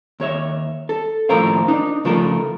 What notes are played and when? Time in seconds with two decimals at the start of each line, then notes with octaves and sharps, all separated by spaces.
0.20 D#2 C#5 E5
0.89 A4
1.29 D#2 A2 F3 A#4 C5 F5
1.68 D4 D#4
2.05 C#3 F3 A3 F4 A4 A#4